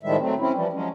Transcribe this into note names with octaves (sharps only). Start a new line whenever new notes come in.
A2 D#3 F3 G3 G#3 E5
F#3 A3 C4
C4 C#4 E4
E3 F3 G3
F3 F#3 G#3 C#4